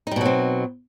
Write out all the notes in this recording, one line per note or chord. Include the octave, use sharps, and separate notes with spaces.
B2 F#3 G3 C4 D#4